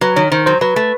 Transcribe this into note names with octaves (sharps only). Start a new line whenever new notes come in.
F#3 B4
D#3 C#5
D#3 C5
F#3 C5
F#3 B4
A3